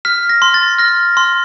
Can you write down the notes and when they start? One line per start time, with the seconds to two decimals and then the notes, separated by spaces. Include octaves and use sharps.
0.05 F6 B6
0.29 A#6
0.42 C6
0.54 A6
0.78 F6 A#6
1.17 C6